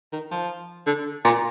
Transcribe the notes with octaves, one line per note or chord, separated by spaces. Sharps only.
D#3
F3
D3
A#2